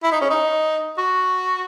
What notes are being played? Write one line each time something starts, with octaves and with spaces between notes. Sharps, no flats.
E4
D#4
C#4
D#4
F#4